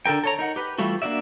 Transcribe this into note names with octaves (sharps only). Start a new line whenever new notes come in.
D3 A4 A#4 G5
A4 C#5 A#5
D#4 A#4 F#5
G4 B4
E3 G3 A3 F4 F#4
A#3 D4 F#4 D5 E5